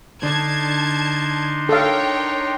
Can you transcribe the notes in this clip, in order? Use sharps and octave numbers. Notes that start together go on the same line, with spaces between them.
D3 D4 D#4 A5 C6 G#6
A4 A#4 C#5 F5 G5